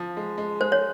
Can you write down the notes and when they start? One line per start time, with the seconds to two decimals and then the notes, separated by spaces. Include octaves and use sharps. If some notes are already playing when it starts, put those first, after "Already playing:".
Already playing: F3
0.17 G#3
0.38 G#3
0.61 G#3 C5
0.72 C#5